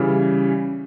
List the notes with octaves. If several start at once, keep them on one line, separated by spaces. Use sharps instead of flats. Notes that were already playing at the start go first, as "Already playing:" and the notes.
Already playing: C#3 E3 G3